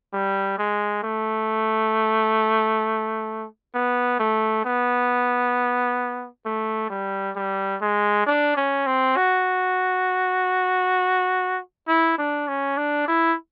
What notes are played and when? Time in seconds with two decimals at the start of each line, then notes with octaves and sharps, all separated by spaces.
0.13 G3
0.58 G#3
1.03 A3
3.74 B3
4.20 A3
4.65 B3
6.46 A3
6.90 G3
7.36 G3
7.81 G#3
8.26 D4
8.57 C#4
8.86 C4
9.17 F#4
11.88 E4
12.18 D4
12.48 C#4
12.77 D4
13.08 E4